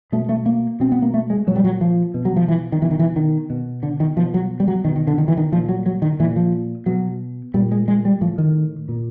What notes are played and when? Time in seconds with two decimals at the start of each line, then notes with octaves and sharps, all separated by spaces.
0.12 B2 A3
0.29 A3
0.46 A#3
0.80 B2 C4
0.92 B3
1.02 A#3
1.14 A3
1.30 G#3
1.47 A#2 F#3
1.56 G3
1.64 F#3
1.81 F3
2.14 B2
2.25 F#3
2.36 F3
2.48 E3
2.72 D#3
2.82 B2 E3
2.91 D#3
2.99 E3
3.16 D#3
3.50 B2
3.83 D3
4.00 D#3
4.17 B2 F3
4.34 F#3
4.60 G3
4.68 F#3
4.85 B2 D#3
4.96 D#3
5.07 D3
5.18 D#3
5.28 E3
5.37 D#3
5.52 A#2 F3
5.69 F#3
5.86 F#3
6.02 D#3
6.20 A#2 E3
6.36 F3
6.86 B2 F#3
7.54 A#2 G3
7.72 G#3
7.88 G#3
8.05 G3
8.21 A2 F3
8.38 D#3
8.89 A#2